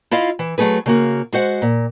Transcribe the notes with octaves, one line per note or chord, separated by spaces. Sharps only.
E4 F4 D#5 F5
E3
F#3 G#3 A3 G#4 B4
C#3 A#3 F#4
G#3 F#4 C5 F#5
A#2